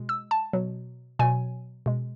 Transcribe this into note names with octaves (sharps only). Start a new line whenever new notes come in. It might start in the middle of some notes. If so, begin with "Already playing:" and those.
Already playing: B2 G#3
E6
A5
B2 F#3
B2 F#3 G#5
B2 G#3